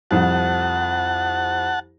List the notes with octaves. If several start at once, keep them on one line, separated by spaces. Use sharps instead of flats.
C2 F2 F3 F#5 A5